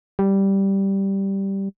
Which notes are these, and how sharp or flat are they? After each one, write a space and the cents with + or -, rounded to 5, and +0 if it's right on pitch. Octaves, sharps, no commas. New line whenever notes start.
G3 -5